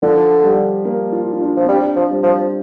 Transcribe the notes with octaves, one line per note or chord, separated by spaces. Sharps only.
D3 F3
G3
A#3
F4
F4
D4
F3
C4
G3 D4
F3
G3
F3